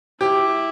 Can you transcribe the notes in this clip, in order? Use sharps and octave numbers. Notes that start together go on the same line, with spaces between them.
E4 G4